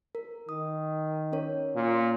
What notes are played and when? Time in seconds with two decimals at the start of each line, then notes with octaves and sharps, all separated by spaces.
0.15 A#4
0.49 D#3 D#6
1.32 C#4 A#4 C#5
1.75 A#2